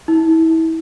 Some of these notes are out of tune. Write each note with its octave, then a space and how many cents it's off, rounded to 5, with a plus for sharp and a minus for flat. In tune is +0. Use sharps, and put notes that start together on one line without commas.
E4 -30